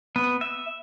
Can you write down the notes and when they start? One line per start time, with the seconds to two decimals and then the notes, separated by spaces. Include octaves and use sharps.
0.16 B3
0.41 E5